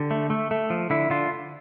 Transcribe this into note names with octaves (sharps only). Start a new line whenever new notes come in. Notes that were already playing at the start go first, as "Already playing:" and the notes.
Already playing: D3 G4
A3
A3
A3
F3
D3 E4
D3 F4